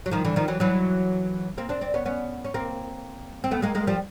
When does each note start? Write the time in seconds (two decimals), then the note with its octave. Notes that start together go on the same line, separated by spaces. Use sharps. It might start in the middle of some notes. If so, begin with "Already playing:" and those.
0.06 F#3
0.11 D#3 F3
0.25 D3 E3
0.36 D#3 F3
0.48 E3 F#3
0.60 E3 F#3
1.58 A#3 C4
1.69 C4 D4
1.81 C4 D4
1.94 B3 C#4
2.06 B3 C#4
2.45 C#4
2.54 A#3 C4
3.44 C4
3.51 A3 B3
3.62 G#3 A#3
3.75 G#3 A#3
3.87 F3 G3